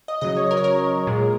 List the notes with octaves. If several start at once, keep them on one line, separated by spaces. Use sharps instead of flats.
D#5
C#3 F#3 D#5
C#5
A#4
C#5
A#4
A#2 G#3